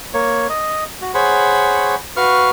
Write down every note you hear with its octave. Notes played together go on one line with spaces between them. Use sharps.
A#3 C#5
D#5
F#4
G#4 C5 C#5 F#5 B5 C#6
F#4 B4 F5 C#6 F6